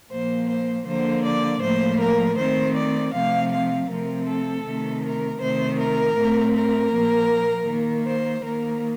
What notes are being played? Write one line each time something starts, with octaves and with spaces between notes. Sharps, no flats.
A#2 F3 A#3 C5
C5
D3 F3 A#3 C5
D5
A2 F3 A#3 C5
A#4
D#3 A3 C4 C5
D5
C3 F3 A3 C4 F5
F5
C3 F3 A3 C4 A#4
A4
C3 D#3 A3
A#4
C3 D#3 A3 C5
A#4
A2 A3 C4
A#4
A#2 F3 A#3
D#3 A#3
C5
D#3 A#3 A#4